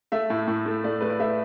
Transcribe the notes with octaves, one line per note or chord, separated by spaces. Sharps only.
A3 E5
A2
A2
A3
A3 D5
A3 B4
D5
A3 E5